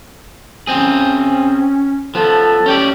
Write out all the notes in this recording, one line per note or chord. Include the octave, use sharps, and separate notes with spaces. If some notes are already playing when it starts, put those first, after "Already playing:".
C4 C#4 G#4
F3 B3 A4
C#4 G4 D5